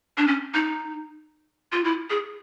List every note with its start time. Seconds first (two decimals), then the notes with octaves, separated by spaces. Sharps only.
0.18 D4
0.27 C#4
0.54 D#4
1.72 F4
1.84 E4
2.10 G#4